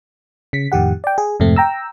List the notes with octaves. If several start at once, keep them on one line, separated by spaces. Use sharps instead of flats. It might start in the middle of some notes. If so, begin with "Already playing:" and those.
C#3 B6
F2 A2 D#3 G4 F#5
D5 G5
G#4
F2 G#2 C3 A3 C4
G5 A#5 E6